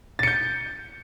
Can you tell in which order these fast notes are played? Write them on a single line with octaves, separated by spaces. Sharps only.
A6 C#7 G6